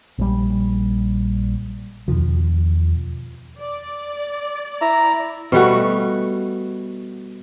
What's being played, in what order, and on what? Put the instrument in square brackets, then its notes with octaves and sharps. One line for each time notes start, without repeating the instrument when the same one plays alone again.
[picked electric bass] A#1 G3
[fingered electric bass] E2 B2 D#3 F3
[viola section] D5
[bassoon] E4 [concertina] A#5
[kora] B2 G3 A3 F#4